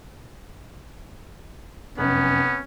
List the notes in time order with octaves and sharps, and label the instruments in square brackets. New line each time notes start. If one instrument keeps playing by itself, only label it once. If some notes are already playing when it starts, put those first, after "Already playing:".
[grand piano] F1 F#2 [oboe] B3 [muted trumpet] C#4